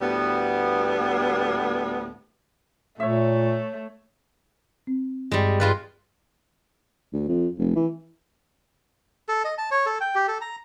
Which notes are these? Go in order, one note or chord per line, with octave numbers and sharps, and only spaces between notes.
D2 A2 G3 B3
A#2 A3 C#5 E5
C4
G2 G3 G#3
G2 G#3 F4 B4
D2
F2
F1
E3
A4
D#5
A5
C#5
A4
G5
G4
A4
A#5